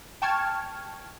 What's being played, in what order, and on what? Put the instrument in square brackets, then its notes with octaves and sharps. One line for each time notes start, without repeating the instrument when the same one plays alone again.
[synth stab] G5 A5 C#6 F6 G#6